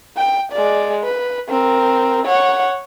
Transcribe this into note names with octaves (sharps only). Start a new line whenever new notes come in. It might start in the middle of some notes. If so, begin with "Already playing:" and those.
G5
G#3 D5
B4
C4 A#4
C#5 F#5